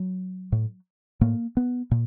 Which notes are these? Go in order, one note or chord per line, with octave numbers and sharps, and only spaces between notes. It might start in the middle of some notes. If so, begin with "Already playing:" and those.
Already playing: F#3
A2
A2 A#3
B3
A#2